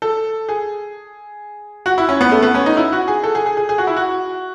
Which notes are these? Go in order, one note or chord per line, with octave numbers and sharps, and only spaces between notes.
A4
G#4
F#4
E4
C#4
B3
A3
B3
C#4
D#4
E4
F#4
G#4
A4
G#4
G#4
G#4
G#4
F#4
E4
F#4